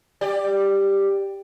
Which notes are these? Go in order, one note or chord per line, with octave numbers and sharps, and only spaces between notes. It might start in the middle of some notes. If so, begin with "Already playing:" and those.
G4 D5